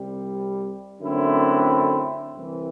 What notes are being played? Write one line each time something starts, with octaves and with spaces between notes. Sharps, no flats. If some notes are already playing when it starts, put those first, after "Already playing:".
Already playing: C2 C3 G3
F#2 D3 A3 C4 E4
C2 C3 E3